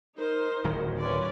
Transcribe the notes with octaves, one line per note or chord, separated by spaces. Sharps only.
D#4 A#4 C5
D1 D#3 F#3
C#4 B4 D5 C6